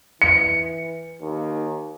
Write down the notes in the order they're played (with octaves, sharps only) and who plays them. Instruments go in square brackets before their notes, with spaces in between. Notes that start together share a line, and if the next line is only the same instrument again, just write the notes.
[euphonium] E3 [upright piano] C#7
[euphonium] D#2